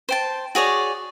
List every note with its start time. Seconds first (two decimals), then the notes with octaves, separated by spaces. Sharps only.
0.09 C5 G5 A5
0.55 F#4 G#4 C#5 D5